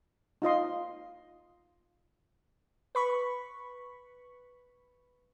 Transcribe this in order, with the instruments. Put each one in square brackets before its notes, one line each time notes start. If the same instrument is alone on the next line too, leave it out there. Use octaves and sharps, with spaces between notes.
[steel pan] D#4 F4 D#5 C6
[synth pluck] B4 B5 C#6